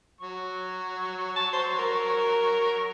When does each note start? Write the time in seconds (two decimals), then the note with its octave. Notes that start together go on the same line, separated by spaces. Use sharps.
0.21 F#3 C#6
1.36 A5
1.53 C5
1.79 A#4